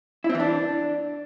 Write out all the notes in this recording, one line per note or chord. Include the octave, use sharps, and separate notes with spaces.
E4
C4
E3
D4